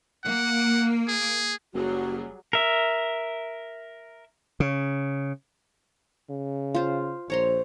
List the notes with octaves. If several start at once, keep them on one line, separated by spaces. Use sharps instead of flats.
A#3 F#5
G#4
F#1 F#3 G3 F#4 G#4
A#4 E5
C#3
C#3
F4 C5
A#1 C5 C#5 A#5 C6